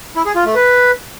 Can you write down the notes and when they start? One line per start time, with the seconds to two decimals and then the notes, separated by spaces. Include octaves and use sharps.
0.16 E4
0.26 G#4
0.36 F4
0.45 A3
0.55 B4